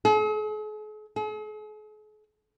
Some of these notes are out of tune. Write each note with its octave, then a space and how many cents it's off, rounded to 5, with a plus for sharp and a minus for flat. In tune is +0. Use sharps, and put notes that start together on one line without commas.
G#4 +45
G#4 +45